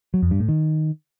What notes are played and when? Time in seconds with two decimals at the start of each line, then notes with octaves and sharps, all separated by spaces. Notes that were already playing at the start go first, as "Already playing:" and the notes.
0.14 F#3
0.22 F2
0.31 G2
0.40 A2
0.49 D#3